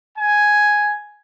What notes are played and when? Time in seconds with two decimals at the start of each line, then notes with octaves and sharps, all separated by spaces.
0.18 G#5